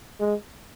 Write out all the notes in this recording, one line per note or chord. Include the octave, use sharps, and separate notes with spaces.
G#3